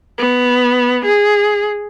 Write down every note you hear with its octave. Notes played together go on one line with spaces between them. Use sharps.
B3
G#4